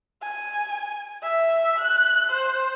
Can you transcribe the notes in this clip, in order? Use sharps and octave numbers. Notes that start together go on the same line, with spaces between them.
G#5
E5
F#6
C5